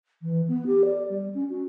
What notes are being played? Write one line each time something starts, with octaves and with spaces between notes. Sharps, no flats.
E3
B3
G4
D5
G3
C#4
F#4